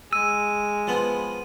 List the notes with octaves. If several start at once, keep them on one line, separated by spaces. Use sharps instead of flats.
G#3 E6 D#7
F3 B3